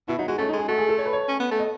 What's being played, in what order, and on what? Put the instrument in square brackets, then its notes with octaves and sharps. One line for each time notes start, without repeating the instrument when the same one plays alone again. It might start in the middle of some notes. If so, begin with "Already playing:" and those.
[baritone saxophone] B2 [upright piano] E4
[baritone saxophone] F#3 [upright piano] D#4
[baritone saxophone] G#3 [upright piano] F#4
[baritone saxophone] A3 [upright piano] C#4
[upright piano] D#4
[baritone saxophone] G#3
[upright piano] G#4
[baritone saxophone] A3 [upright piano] F#4
[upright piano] G#4
A4
C#5
B4
C#5
[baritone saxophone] C#4
B3
A3
[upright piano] D#5